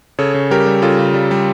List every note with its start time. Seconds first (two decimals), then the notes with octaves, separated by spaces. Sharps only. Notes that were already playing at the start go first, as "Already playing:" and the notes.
0.19 C#3 A4 C#5
0.34 C#3
0.51 G3 G4 A#4
0.66 G3
0.82 C#3 F4 A4
0.99 C#3
1.14 G3
1.31 G3